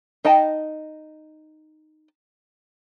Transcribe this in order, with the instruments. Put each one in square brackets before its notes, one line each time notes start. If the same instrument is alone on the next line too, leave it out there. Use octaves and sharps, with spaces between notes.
[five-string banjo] D#4 D#5 G5 A5